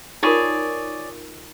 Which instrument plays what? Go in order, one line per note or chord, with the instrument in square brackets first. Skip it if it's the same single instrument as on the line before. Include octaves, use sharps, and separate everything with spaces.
[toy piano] D#4 F4 A#4 [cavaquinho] G#4 C#5 D5